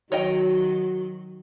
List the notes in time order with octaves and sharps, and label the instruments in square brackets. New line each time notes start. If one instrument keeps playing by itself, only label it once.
[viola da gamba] D#3 F#3 [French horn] F#4 [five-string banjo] C#5 D#5 G5